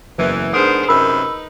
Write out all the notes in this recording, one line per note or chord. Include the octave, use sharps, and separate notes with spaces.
F#1 E2 E3
G#2 B3 D4 G#4 A#4 C5 D#6
F#2 C3 D#4 A#4 B4 B5 E6